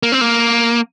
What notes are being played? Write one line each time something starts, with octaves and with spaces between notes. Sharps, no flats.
A#3
C4
A#3